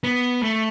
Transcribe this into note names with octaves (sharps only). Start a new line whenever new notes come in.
B3
A3